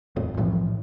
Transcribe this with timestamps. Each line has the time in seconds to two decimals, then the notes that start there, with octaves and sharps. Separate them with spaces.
0.16 D#1 G#1 F2 A2
0.37 B1 A2 E3 F3